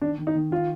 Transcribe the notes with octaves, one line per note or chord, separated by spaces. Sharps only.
D#3 D4
D#3
D#4
D#3
D#3 F4